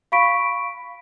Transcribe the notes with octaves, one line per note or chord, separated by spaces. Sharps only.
F5 B5 C#6 B6 D7